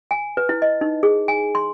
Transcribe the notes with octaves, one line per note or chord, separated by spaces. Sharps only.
G#5
B4
E4
D#5
D#4
G#4
G#5
C6